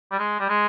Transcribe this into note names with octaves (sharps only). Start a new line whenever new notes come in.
G3
G#3
G3
G#3